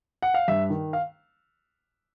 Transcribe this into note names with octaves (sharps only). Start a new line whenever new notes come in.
F#5
F5
G2 E5
D#3
F5